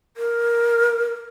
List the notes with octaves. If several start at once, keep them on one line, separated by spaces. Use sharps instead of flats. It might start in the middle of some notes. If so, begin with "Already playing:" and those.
A#4